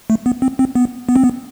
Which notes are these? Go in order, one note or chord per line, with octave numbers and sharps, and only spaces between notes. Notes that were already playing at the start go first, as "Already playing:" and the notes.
A3
B3
C4
C4
B3
B3
C4
B3